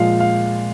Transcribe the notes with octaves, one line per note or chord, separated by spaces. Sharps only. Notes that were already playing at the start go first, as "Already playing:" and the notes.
Already playing: A#2 F3 G#3 F5
F5